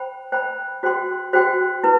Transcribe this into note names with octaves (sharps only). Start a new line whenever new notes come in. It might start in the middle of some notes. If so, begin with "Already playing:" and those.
Already playing: C5 G5 B5
C5 G5 B5
F#4 C5 G5 C6
F#4 C5 G5 C6
E4 B4